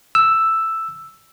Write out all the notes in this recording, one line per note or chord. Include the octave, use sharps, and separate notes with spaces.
E6